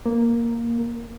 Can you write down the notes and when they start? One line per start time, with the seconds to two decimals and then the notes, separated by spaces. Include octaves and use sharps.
0.06 A#3